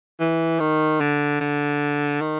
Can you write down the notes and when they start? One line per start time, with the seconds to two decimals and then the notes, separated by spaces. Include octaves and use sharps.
0.20 E3
0.60 D#3
1.00 D3
1.40 D3
2.21 D#3